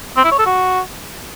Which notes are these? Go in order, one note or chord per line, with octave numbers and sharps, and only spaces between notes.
C4
E4
C#5
A4
F#4